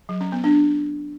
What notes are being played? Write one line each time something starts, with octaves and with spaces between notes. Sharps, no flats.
F#3
C#4
B3
D4